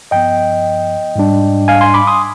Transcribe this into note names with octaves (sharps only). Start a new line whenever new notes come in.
G2 F3 B3 D#5 G5
G#2 G3 D4
F5 G#5
G#5 C6
B5 D6
C6 D#6